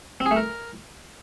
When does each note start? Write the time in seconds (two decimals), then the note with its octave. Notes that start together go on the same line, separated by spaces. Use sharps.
0.20 C4
0.26 G#4
0.31 A3
0.36 A#4